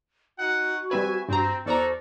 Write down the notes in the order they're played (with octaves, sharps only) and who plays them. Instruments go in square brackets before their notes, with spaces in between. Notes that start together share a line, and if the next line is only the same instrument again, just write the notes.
[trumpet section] D#4 F#5 [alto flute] F#4
[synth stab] G3 C4 B4 [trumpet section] E5 G#5
[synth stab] G2 A#5 [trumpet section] C4
[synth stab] E2 D5 A#5 [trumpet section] F#4 A4 A#4 [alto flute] C5